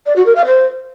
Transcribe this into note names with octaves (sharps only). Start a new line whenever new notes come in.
D5
F#4
A#4
F5
C5